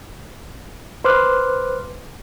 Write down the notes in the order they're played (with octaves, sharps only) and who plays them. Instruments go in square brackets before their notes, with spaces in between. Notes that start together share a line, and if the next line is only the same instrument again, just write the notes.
[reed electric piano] B4 C5 C6 D6 F6 F#6